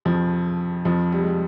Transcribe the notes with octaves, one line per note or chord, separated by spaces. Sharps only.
F2 F3
F2 F3
G3
G#3
G3